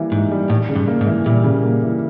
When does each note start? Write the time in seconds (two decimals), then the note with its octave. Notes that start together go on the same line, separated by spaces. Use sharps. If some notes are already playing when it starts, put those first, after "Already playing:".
Already playing: E3 G3 A#3
0.12 G#2 D#4
0.32 G3
0.50 A2 G3
0.69 C#3
0.76 G2
0.88 A#3
1.01 G#2
1.07 E3
1.26 A#2 G3
1.44 C#3
1.63 A#3
1.83 E3